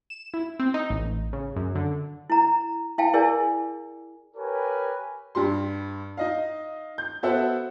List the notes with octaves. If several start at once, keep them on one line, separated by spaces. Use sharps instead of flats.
E7
E4
C4
D#4
A1
C#3
F#2
D3
E4 A#5
E4 F5 G5 A5
E4 G#4 A#4 D5 G#5
G4 A#4 B4 C#5 G#5
G2 G3 C6
D#4 D#5 F5
G6
B3 F#4 A4 C5 E5 F#5